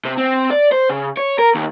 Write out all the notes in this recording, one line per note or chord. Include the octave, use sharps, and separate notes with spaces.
C3
C4
D5
C5
C#3
C#5
A#4
D#2